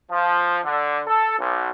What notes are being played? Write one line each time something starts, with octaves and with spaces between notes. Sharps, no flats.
F3
D3
A4
B1